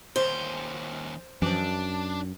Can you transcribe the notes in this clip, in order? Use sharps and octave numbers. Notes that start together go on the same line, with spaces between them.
D#2 C#4 C5
F#2 E3 F3 D4